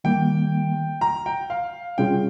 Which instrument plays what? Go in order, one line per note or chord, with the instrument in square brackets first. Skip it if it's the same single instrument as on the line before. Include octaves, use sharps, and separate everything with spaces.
[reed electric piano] D#3 G3 A#3 [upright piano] G5
[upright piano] A#5
G5
F5
[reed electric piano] C3 G3 C#4 F4 G#4 [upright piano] G5